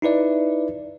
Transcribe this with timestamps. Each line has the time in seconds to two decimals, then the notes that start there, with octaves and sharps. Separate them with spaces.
0.02 D#4 E4 B4 D5 E5